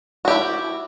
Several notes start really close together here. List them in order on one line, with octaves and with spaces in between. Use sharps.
F#4 G4 E4